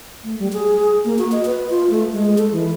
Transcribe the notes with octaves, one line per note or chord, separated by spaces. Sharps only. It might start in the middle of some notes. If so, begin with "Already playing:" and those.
A3
G3
G#4
A#3
F#4
D#5
B4
F4
A3
G#3
A4
E3